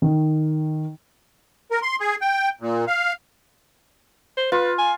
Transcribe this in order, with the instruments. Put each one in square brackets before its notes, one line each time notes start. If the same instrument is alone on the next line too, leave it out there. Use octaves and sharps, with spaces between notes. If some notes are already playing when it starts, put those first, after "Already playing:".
[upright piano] D#3
[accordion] A#4
C6
G#4
G5
A#2
F5
[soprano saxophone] C5
[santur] F4 [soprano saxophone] B4
[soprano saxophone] G#5